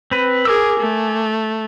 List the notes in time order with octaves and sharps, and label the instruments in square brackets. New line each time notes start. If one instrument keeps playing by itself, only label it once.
[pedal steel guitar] C4 B4
[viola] G#4 A#4 [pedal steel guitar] G#5 D6 E6
[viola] A3